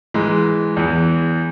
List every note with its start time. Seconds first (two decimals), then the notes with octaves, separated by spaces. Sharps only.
0.14 G#2 E3 G#3
0.76 E2 E3